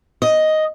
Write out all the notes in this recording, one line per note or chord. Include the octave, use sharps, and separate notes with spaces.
D#5